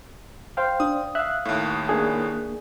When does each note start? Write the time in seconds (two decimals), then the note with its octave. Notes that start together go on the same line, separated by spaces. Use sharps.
0.57 C5 F5 G5
0.80 D4 D#6
1.15 E5 F5 F#6
1.45 D#2 A2
1.89 A#3 D4 G#4